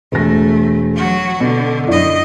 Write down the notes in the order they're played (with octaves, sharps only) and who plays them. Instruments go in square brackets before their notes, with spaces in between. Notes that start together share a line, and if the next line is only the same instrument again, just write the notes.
[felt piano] E1 A#6 [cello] A3
[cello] F#3 F#4
[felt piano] B2 [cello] D3
[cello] F#2 D#5 [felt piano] D4 E4 D5